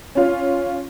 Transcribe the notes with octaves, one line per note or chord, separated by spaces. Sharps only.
C#4 F4